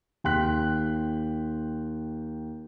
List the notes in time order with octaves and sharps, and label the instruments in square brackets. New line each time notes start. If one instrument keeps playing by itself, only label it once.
[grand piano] D#2 G5 C6 F#6 B6